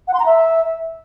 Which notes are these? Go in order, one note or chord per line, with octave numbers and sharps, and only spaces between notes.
F#5
C6
A#5
E5